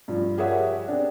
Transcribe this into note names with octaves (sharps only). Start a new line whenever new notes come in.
G2 F3
G4 G#4 A#4 C#5 E5 F#5
C4 D4